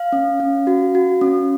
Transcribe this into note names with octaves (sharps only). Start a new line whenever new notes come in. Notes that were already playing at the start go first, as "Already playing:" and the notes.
Already playing: F5
C#4
C#4
F#4
F#4
C#4